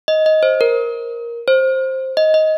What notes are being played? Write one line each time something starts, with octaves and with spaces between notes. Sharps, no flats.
D#5
D#5
C5
A#4
C5
D#5
D#5